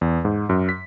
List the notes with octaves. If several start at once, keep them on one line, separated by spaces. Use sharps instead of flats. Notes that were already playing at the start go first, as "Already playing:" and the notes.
E2
G#2
F#2
B6